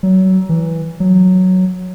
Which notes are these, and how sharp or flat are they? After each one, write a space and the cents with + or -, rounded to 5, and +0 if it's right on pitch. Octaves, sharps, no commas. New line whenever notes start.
F#3 +25
E3 -5
F#3 +0